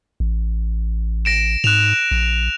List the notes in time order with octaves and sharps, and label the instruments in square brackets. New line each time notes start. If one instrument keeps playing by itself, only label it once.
[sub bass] A1
[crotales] A#6 D7 E7
[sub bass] G#2 [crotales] F#6 E7 F7
[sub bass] A#1